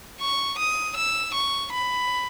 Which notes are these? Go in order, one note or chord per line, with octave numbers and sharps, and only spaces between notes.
C#6
D#6
E6
C#6
B5